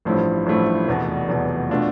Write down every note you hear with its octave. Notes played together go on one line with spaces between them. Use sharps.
A1 G2 F3 A3 E4
A1 G2 F3 A3 E4
F1 E2 B2
F1 E2 B2
B2 A3 D4 F4